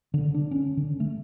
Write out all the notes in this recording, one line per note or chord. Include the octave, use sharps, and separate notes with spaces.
D3
D4
C#4
D3
A3